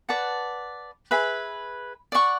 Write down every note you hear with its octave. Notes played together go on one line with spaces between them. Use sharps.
B4 D5 F#5 A5
G#4 B4 E5 B5
D5 F#5 C#6